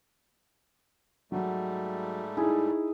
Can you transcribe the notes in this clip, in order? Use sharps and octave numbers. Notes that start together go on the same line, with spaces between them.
G#2 F#3 G3 A3
D#4 E4 G#4